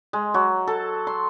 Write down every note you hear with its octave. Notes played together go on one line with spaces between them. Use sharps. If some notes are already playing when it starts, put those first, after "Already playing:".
G#3
F#3
A4
C6